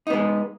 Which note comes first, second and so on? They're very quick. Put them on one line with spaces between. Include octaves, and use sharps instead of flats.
D#4 B3 G#3